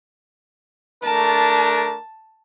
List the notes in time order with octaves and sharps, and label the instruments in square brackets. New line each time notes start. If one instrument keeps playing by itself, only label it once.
[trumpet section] A3 D4 A#4 [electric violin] A5